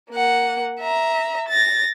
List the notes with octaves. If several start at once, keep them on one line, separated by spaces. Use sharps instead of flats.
A#3 F#5
E5 A#5
A6 A#6